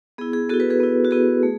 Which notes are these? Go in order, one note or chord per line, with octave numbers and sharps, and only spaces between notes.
B3 E4 G#4
G#4
B3 E4 F#4 A4
G#4 B4
G#4 B4
B3 E4
F#4
B3 E4 G#4
A3